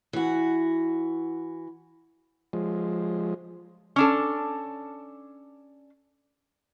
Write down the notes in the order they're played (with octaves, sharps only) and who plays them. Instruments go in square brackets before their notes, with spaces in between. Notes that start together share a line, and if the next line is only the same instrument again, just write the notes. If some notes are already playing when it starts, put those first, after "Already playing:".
[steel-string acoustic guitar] E3 F#4
[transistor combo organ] F3 G#3
[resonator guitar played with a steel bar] C#4 D4 A4